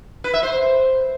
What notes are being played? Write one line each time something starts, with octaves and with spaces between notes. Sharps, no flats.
B4
E5
C5